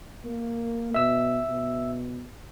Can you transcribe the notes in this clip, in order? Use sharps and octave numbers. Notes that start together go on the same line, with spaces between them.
A#3
B2 E5 E6
B2